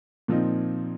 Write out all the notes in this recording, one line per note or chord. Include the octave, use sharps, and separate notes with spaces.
A#2 F3 C4 D#4